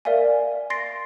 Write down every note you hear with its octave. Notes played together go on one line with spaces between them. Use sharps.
A#4 D5 E5 F5 G#5
C6 A6 A#6 C7 D7